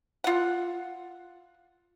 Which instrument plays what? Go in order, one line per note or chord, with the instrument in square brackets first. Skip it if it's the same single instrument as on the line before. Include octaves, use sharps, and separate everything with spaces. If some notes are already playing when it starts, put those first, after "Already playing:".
[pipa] F4 F#5